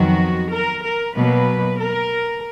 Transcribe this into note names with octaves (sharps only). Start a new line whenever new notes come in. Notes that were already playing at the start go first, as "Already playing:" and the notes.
Already playing: F2 D#3 F#3 B3 F#4
A#4
A#4
B2 F#3 A#3 B4
A#4